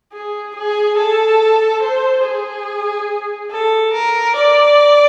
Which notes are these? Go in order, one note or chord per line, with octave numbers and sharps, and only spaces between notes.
G#4
G#4
A4
C5
G#4
A4
A#4
D5